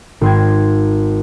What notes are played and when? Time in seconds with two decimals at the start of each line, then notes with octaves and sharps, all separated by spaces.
0.21 G#1 C6 G#6